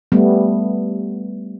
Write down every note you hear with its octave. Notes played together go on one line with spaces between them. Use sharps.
G3 A3 B3